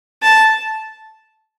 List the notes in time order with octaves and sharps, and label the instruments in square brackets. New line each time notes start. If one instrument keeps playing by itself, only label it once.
[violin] A5